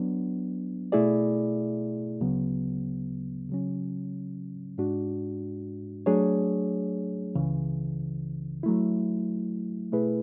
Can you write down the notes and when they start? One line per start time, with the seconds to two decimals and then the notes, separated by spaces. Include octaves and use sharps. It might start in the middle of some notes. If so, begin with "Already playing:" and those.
Already playing: F#3 B3 D4
0.92 B2 A3 E4 G#4 D5
2.21 D2 C#3 F#3 B3
3.49 C#3 F#3 C#4
4.78 G#2 G#3 D4 F#4
6.06 F#3 A3 D4 G#4 C#5
7.35 C#2 C#3 E3
8.63 F#3 A3 E4
9.92 B2 A3 E4 G#4 B4